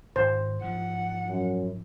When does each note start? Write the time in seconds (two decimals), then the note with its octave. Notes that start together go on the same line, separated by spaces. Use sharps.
0.16 G#1 G#2 G#3 C5
0.61 G#2 F3 F#5
1.27 F#2